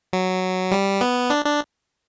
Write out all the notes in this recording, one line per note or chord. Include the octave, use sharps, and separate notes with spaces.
F#3
G3
B3
D4
D4